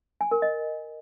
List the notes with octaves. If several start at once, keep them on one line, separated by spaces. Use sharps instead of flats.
G#5
A#4
D#5